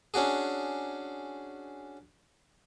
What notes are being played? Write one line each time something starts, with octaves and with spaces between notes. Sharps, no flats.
C#4 D4 F#4 G#4